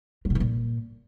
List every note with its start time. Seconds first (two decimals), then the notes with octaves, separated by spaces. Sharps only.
0.25 F#3
0.30 B2
0.35 E3
0.40 A#2